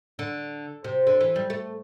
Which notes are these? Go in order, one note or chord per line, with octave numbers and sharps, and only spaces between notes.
D3
C3
D3
E3
G3
A3